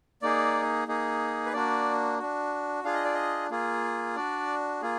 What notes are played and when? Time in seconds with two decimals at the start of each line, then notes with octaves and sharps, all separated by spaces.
0.22 A#3 D#4 G#4 D5
0.88 A#3 D#4 G#4
1.46 B4
1.53 A#3 D4 F#4 D5
2.19 D4 F#4
2.84 D4 F4 G#4 F5
2.94 D#5
3.04 D5
3.14 D#5
3.50 A#3 F4 G#4
4.16 D4 F#4 D5
4.81 A#3 F4 G#4